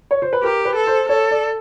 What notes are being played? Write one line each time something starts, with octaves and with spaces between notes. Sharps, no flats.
C#5
C5
B4
G4 A#4
B4
A4
C5
A4 C#5
D5